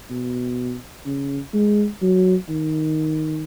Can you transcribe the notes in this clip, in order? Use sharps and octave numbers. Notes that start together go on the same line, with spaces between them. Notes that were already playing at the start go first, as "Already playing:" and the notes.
B2
C#3
G#3
F#3
D#3